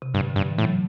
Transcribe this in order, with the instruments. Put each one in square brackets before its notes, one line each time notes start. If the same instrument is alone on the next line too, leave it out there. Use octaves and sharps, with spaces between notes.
[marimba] C3
[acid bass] G2 [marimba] D3
[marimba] D3
[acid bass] G2
[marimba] E3
[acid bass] A2
[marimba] F#3